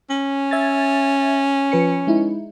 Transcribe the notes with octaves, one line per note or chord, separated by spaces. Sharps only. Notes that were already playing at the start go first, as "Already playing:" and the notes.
C#4
E5 G#6 A6
F3 B4 C#7
G#3 D#4 E4